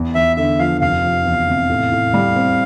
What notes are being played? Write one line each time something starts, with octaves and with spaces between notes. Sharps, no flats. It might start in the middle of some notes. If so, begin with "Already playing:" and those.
Already playing: E2
E2 E5
D3 E5
F3 F5
F1 F5
F3
E2
C3
A2
A2
G3
C4